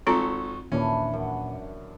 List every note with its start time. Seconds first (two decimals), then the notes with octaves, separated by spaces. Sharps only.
0.07 G#1 C4 F4 A4 A#5 C#6
0.72 D#2 A#2 E3 C#4 D4
1.13 F#2